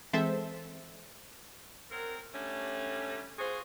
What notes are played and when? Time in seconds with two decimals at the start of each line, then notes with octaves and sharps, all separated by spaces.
0.13 E3 G#3 C4 A4 C5 E5
1.90 F#3 C4 A#4
2.32 D3 G3 A3 C#4
3.38 F4 F#4 G#4 C5